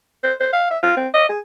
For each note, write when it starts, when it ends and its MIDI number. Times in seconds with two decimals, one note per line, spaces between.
0.23 0.34 72
0.40 0.50 72
0.53 0.66 77
0.70 0.78 76
0.83 0.92 65
0.96 1.08 60
1.14 1.27 75
1.29 1.39 68